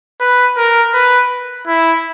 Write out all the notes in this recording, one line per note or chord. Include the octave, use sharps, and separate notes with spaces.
B4
A#4
B4
E4